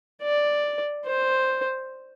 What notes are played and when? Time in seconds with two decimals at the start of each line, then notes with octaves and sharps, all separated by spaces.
0.22 D5
1.06 C5